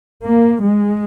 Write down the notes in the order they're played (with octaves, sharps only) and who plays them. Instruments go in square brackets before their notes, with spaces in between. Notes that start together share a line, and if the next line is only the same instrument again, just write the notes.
[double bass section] A#3
G#3